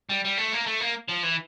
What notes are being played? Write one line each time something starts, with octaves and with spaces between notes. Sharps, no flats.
G3
G3
A3
A#3
A3
A#3
F3
E3